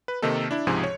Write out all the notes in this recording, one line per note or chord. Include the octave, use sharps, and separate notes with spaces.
B4
C3 D#3 A#3 D#4 A4
D4 E4
C#2 G#2 C3 F3 G#4
C#5